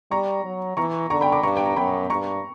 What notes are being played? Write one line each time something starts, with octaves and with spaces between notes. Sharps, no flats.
G3 A#5 C#6
F#3
E3 A#5 C#6
D3 A#5 C#6
G5 B5
B5 D6
G2 A#5 C#6
G5
A#5
F#2 G5 B5
G2 A#5 C#6